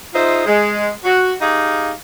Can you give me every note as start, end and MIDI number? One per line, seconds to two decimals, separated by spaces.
0.14 0.42 63
0.14 0.42 65
0.14 0.42 68
0.14 0.42 72
0.14 0.42 76
0.46 0.89 56
1.04 1.33 66
1.40 1.91 63
1.40 1.91 67
1.40 1.91 68
1.40 1.91 77